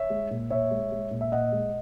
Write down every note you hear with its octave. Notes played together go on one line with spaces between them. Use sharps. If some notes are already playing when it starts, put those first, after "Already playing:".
Already playing: C#5 E5
G#3
A#2
A#2 C#5 E5
G#3
G#3
A#2
E5
A#2 D#5 F#5
G#3